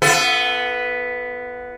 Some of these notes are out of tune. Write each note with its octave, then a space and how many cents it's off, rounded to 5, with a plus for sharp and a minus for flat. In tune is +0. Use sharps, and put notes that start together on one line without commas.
B3 +0 F4 -40 A4 +0